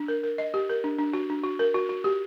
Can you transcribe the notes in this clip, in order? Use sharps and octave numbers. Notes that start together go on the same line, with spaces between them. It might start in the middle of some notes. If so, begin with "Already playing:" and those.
Already playing: D4
A#4
A#4
D#5
G4
A#4
D4
D4
F#4
D4
F#4
A#4
F#4
F#4
G4